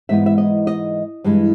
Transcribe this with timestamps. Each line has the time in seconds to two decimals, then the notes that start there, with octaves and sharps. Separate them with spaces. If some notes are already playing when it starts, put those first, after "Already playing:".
0.09 G#2 E3 G#3 B3 E5
0.26 E5
0.38 D#5
0.67 D#5
1.24 G2 E3 G#3